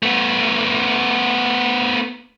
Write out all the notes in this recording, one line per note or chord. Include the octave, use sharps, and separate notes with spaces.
A3 B3